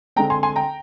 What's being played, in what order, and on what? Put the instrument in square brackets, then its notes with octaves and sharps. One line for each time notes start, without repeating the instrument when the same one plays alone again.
[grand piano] D3 G#3 C4 G5 A#5
G#5 C6
G#5 C6
G5 A#5